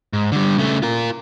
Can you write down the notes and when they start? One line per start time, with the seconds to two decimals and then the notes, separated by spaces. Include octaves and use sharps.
0.13 G#2
0.32 D3 G3
0.58 C#3 A3
0.82 F4 A#4